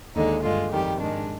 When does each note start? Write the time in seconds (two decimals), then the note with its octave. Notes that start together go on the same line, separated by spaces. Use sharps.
0.15 D#2 D3 G#3 D#4
0.43 G2 D3 G#3 F4
0.72 F2 D#3 G3 G4
1.00 G#2 D#3 G#3 D4